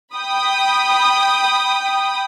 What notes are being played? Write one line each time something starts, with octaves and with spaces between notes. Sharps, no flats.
G5 B5 D#6